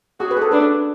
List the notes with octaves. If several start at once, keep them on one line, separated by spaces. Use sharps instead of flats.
F#4 G#4
B4
G#4
A4
D4 B4